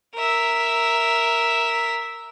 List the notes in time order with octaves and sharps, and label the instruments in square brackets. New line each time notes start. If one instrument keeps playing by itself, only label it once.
[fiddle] A#4 E5